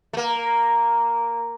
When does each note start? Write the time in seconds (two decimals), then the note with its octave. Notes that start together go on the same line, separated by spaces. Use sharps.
0.13 A3
0.17 A#3